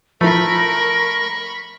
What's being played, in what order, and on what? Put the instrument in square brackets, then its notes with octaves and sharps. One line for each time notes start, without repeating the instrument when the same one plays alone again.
[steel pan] F3 E4 [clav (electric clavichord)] A3 [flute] A#4 [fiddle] B5 C#6